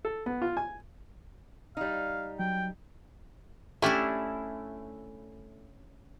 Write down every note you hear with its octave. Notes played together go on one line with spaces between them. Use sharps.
A4
B3
F4
G#5
G3 D#4 F5
F#3 G5
A3 C#4 D4 E4 G4 E5